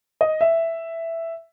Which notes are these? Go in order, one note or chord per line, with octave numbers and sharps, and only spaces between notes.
D#5
E5